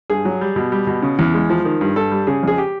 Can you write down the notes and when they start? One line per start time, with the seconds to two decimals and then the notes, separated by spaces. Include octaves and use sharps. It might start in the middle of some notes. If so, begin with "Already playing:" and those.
0.10 G2 G#4
0.25 F#3
0.41 G3
0.56 B2
0.72 G3
0.87 B2
1.02 C#3
1.19 E2
1.34 G#3
1.50 F3
1.65 D#3
1.81 G2
1.96 G2 A4
2.11 G3
2.27 C#3 G#4
2.43 F2 G#4
2.58 G4